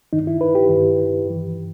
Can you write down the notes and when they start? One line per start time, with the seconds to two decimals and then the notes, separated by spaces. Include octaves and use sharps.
0.13 G2 D#3 D#4
0.27 E4
0.41 B4
0.55 G4
0.70 G2 D#3
1.26 G2 E3